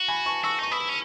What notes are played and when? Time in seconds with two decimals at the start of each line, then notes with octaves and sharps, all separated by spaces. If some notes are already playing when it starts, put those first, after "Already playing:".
Already playing: F#4
0.08 G#5 B5
0.26 A5 C#6
0.44 F#4 C#6 E6
0.59 D#4 C#6
0.71 E4 B5 D#6
0.89 C#4